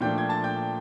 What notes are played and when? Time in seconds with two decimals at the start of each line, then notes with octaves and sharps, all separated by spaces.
0.01 A#2 F3 A3 D4 G5 G6
0.18 G#6
0.29 A5 A6
0.44 G5 G6